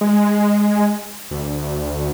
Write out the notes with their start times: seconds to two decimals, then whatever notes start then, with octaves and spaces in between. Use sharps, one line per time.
0.01 G#3
1.31 D2